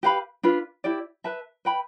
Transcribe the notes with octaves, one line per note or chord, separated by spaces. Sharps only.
G4 B4 F5 B5
D4 F4 B4
E4 G4 D5
B4 E5 A5
B4 E5 G5 B5